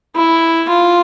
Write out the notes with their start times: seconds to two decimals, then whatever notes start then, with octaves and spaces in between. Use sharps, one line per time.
0.15 E4
0.69 F4